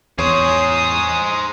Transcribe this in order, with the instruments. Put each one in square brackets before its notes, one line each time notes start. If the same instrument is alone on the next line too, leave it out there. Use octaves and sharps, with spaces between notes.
[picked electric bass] E2 [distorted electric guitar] G#4 C5 [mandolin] C#5 [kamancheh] D#6